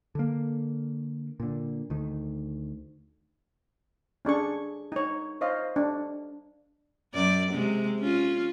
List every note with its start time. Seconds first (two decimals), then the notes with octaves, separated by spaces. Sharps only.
0.15 D3 A#3
1.40 A#2 D3
1.90 D2 D#3
4.25 C#4 D4 G#4 C#6
4.92 D#4 C#5
5.41 C5 C#5 D#5 F5
5.76 D4
7.14 F#2 D5
7.52 C3 G#3
8.00 C#4 F4